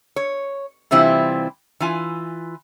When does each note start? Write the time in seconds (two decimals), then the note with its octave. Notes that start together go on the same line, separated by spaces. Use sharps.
0.16 C#5
0.91 C3 E3 G3 C4 E4 F4
1.80 E3 F4 G#5